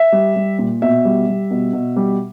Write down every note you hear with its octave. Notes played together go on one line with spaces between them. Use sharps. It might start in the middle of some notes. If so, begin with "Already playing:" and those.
Already playing: E5
G3
G3
A#2
B2 E5
G3
G3
B2
B2
G3